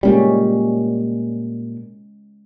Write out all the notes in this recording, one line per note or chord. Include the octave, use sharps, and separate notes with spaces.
A#2 G3 G#3 C#4